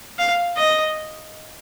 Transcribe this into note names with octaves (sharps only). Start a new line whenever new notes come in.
F5
D#5